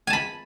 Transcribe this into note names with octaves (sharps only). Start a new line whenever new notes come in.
G#5 A5 B5